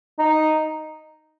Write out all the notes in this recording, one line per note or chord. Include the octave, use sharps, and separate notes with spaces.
D#4